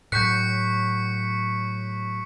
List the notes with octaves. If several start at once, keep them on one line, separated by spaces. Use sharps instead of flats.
A2 F#3 C#6 F#6 G6 B6 C#7